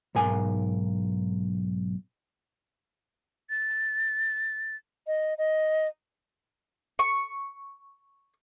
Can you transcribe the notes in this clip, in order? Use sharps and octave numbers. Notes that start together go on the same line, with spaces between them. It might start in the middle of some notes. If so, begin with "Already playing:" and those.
B1 G#2 A#4 G#5
A6
D#5
D#5
C#6